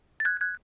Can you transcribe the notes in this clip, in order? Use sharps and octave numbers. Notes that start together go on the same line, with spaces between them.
A6
F#6 G#6
F#6 G#6